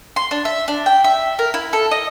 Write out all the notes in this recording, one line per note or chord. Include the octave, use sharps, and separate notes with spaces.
C6
D4
E5
D4
G5
E5
A#4
E4
A4
D#5